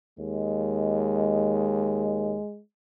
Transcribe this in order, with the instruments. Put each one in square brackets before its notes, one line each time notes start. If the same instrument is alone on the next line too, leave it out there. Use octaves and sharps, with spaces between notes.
[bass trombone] D#2 [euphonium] G#3